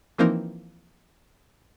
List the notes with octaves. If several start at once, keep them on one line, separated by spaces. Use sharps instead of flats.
E3 F3 A#3 C4 D#4 A#4